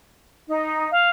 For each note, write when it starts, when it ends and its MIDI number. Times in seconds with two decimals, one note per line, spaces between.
0.48 0.87 63
0.91 1.10 77